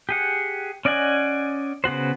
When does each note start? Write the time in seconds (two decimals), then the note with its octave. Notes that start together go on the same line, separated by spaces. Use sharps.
0.09 G4 G#4 F#5
0.85 C#4 D5 D#5 F#5 G#5
1.84 C#3 B3 F#4 C5